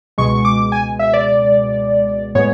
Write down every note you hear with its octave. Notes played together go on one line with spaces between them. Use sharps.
C#2 B2 G#3 C#6
D6
G#5
E5
D5
A2 G#3 B3 C#5